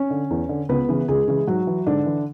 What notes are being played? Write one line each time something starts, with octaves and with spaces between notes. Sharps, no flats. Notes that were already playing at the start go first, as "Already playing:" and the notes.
Already playing: C#4 C#5
D3
E2
D3
C#2 B3 B4
C#3 E3
C#2 G#3 G#4
C#3 E3
G#2 F#3 F#4
E3
G#2 D3 D4
E3